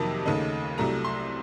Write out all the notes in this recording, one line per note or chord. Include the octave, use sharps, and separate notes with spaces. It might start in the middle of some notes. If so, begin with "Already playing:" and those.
Already playing: F2 C3 D#3 F#3 A#3 A5
D#2 C#3 A3 D#4
C2 C3 F#3 A3 A#5
C6